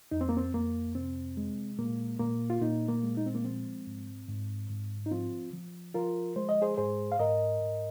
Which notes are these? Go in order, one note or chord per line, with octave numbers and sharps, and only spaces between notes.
F2 D#4
C4
A#3
C4
F2 A#3
C3 C4
G#3
A#2 A#3
A#2 A#3
F4
A#2 A#3 D#4
A#3
G#3
D#4
C4
A#3
F3 C4
G#2
G#2
G#2
D#4
F3 C4 F4
F3
F3 F4 A#4
G#3 C5
D#5
G#4 C5
G#2 G#4 C5
F5
G#2 A#4 D#5
G#2